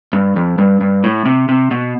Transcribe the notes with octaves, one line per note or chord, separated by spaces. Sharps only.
G2
F2
G2
G2
A2
C3
C3
B2